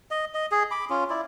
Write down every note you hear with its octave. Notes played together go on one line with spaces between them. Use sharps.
D#5
D#5
G#4
B5 D6
C#4 F4
E4 D5